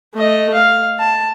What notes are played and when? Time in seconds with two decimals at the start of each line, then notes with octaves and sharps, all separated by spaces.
0.14 A3 D#5
0.54 F5
0.99 A5